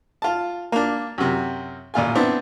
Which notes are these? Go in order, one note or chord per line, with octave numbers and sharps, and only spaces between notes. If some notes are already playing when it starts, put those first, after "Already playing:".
F4 A5
A#3 D4
F#2 C3
A1 A#2 F4 G#5
B3 C4 D4 E4